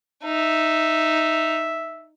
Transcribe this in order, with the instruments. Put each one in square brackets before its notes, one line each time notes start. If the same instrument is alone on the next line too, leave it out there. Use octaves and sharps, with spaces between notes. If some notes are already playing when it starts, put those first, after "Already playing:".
[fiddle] D#4 [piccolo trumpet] E5